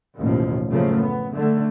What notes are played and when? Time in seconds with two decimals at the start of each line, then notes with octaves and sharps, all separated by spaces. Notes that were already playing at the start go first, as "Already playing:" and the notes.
0.18 A1 D#2 B2 F3
0.70 F#2 A2 C#3 F3 A3 A#3
0.99 B3
1.32 D3 A3